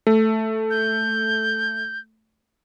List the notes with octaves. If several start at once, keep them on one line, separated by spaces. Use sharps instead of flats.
A3
G6